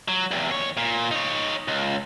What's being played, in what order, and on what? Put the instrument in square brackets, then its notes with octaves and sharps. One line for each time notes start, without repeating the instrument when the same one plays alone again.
[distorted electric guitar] F#3
E2 C3
D#2 C#5
A#2
D#4 C#5
C#2